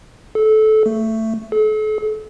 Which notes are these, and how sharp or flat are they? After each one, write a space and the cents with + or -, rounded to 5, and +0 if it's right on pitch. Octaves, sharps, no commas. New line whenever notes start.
A4 -20
A3 +15
A4 -40